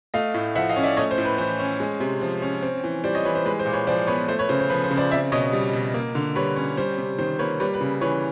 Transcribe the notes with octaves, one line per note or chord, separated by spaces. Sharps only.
A3 D#5 F5
A2
F3 E5 F#5
D#5 F5
C#4
D5 E5
A3 C#5 D#5
C5
A2
B4
E3 C5
C#4
G#3
C3
F3
C#4
C4
E3
G3 C5 D5
C#5 D#5
E3 B4 C#5
C5
G#3 B4
C5
A#2
B4 C#5
F3 C5 D5
B3 B4 C#5
A3 C5
B4 C#5
C#3 C5
C5
F3 B4
C5
C#3
C5 D5
C4 D5 E5
B2 C#5 D#5
G3
B2
A#3
D3
G3 B4 C#5
C#4
G3 C5
C3
D#3 C5
A#3 B4 C#5
G3 B4 C#5
B4
C#3
E3 B4 C#5